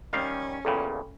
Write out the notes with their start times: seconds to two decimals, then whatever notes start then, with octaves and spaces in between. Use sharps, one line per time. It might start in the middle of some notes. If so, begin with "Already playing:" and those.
0.13 D#3 G3 C#4 F5
0.65 E2 A#2 C#3 A4 G5 B5